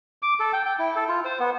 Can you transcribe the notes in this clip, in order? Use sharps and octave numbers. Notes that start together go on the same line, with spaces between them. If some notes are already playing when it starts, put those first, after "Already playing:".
D6
A4
G5
G5
E4
A4
F4
C5
B3